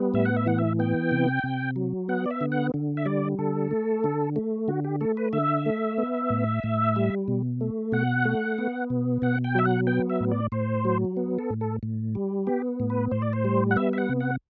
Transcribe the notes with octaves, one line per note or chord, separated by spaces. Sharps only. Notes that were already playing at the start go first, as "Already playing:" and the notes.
Already playing: G3 B3
A2 E5
F#5
E5
E3 F#5
E5
B3 G5
C3
C3
F#3
B3 F#5
D5
E5
D3
F#5
D3
E5
G3 D5
D3 A4
A3
D3
A3
D3 F#4
G4
A3 A4
B4
D3 E5
A3
B3
A2
A2
G3
B2
A3
B2 F#5
A3
B3
B2
B2 F#5
G5
F#3 E5
F#5
B3 G5
E5
A2
D5
A2 C5
F#3
B3
A4
A2
A4
A2
G3
B3 G4
A2
B4
A2 C5
D5
C5
G3
F#5
B3 E5
E5
F#5
C3
F#5